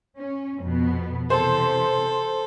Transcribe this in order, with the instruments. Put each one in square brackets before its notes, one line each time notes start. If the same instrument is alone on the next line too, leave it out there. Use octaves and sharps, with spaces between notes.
[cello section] C#4
F2 B2 B3
[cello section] C3 E3 [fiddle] A4 [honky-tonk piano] C5